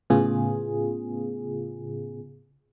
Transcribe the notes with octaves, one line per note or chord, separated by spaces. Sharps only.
A2 C#3 B3 F4 G#4